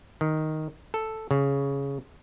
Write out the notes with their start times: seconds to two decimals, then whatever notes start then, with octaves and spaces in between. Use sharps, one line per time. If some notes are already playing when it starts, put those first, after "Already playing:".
0.21 D#3
0.94 A4
1.31 C#3